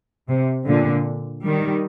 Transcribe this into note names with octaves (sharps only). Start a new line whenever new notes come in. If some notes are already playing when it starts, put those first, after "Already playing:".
C3
A#2 D3
D#3 G3